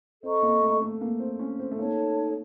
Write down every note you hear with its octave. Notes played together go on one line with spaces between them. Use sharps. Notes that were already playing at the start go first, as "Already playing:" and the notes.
C4 A4 D#5 A#5 C#6
A#3
A3
A3
A#3
C4
C#4
C4
A3
A#3 D#4 A4 C#5 A5